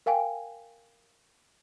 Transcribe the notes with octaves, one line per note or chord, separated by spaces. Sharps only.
A#4 F5 G5 G#5